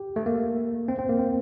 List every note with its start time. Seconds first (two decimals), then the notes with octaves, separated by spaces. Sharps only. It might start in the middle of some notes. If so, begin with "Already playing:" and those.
Already playing: G4
0.16 A3
0.26 A#3
0.88 C4
0.99 C4
1.09 A#3
1.19 C4